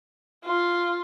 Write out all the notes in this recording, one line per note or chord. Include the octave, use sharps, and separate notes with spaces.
F4